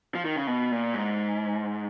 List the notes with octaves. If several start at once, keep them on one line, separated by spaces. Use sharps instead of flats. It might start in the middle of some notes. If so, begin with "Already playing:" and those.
F3
D#3
C#3
B2
A#2
G#2